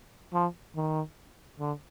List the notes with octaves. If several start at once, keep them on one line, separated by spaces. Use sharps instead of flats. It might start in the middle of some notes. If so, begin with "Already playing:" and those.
F3
D#3
D3